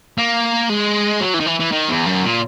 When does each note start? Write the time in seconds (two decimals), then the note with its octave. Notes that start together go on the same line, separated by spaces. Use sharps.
0.18 A#3
0.70 G#3
1.21 F#3
1.34 E3
1.40 D#3
1.46 E3
1.60 E3
1.72 D#3
1.89 E2
2.06 F#2
2.23 A#2